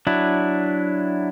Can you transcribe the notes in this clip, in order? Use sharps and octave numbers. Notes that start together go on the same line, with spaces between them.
F#3 D4 E4